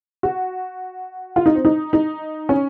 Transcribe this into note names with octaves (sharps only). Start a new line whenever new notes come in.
F#4
F4
D#4
C4
D#4
D#4
C#4